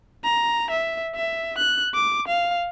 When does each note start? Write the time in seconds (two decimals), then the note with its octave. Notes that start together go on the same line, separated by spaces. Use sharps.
0.24 A#5
0.71 E5
1.16 E5
1.58 F#6
1.95 D6
2.28 F5